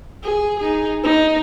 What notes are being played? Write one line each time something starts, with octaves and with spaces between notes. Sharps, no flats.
G#4
D#4 G#4
D#4